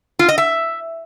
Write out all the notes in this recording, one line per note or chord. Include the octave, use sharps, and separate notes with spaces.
F4
D#5
E5